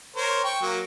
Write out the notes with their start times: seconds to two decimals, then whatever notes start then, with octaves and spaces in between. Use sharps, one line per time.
0.16 A#4 C5 C#5
0.44 G5 C#6
0.61 F#3 A#3